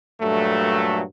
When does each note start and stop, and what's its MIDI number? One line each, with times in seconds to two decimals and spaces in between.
0.21 1.01 43
0.21 1.01 46
0.21 1.01 54
0.21 1.01 57